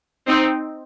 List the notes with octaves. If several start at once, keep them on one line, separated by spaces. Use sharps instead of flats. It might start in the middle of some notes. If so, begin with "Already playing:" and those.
C4 D#4